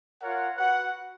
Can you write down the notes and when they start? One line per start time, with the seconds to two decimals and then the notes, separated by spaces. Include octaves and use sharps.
0.20 F4 A#4 C#5 F#5
0.57 F#4 B4 F#5